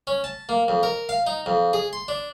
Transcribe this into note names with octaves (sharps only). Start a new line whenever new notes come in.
C#4
A5
A#3
F2
A#4
F5
D#4
F2
G#4
C6
D4